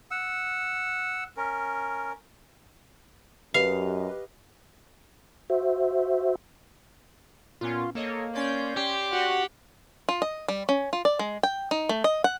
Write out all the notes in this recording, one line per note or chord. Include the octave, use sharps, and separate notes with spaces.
F#5 E6
C#4 A#4
F#2 G4 B4 D#5 F5
F#4 C5 E5
A#2 B3 C#4 F4
A#3 A4 C#5 D#5
C#4 D5 C6 G6
G4
F#4 F#5
F4
D#5
G3
C#4
F4
D5
G#3
G5
D#4
A3
D#5
F#5